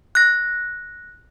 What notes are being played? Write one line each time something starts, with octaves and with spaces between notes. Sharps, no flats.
F#6 A#6